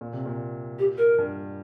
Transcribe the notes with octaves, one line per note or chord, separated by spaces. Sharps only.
A#2
C3
A#2
G4
A#4
G2